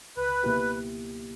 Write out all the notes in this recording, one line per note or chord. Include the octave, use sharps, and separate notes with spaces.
C#2 B4
B2 A#3 E4 G4